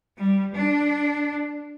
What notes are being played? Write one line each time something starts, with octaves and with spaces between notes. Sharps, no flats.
G3
D4